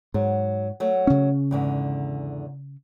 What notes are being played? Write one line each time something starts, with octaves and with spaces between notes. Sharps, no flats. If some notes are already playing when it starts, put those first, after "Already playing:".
G#2 F#3
F#3 A3
C#3 C#4
E2 G#2 D3